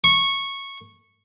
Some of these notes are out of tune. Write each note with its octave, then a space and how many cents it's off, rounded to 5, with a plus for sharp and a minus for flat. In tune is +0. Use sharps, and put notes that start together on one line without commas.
C#6 -10